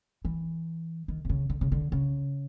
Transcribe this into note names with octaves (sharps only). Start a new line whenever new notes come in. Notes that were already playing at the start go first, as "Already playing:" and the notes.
E3
D#3
C3
C#3
D3
C#3
D3
C#3